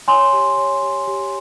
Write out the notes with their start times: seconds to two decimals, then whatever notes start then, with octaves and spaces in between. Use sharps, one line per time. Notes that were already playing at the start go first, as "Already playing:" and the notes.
0.08 C#5 G#5 C6
0.33 G4
0.58 C#5
0.83 G4
1.07 G4